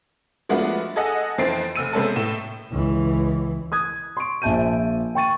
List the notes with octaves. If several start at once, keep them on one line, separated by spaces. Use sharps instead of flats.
F3 G#3 A3 B3 D4 F#4
G#4 A4 D#5 F#5
F2 E3 C5 A6 C7 D7
F1 E6 D#7
C3 G#3 B3 C#4 A4
A2 E7
C#2 E3
D#6 F#6 G#6
C6 C#6 D7
A#1 F3 E5 A5 G6 D#7
G5 C#6 A6 D#7